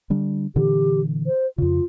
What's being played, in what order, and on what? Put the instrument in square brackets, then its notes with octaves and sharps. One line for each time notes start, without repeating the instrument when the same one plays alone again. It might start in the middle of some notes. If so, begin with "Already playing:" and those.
[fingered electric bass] D3 G3 D4
[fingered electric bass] A#2 D3 E3 [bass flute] G4
[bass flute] C5
[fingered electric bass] F2 C#3 [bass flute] F4